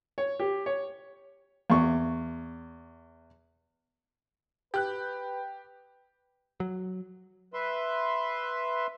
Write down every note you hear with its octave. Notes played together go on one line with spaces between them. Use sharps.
C#5
G4
C#5
E2 C#6
G4 B4 F#6
F#3
B4 E5 C6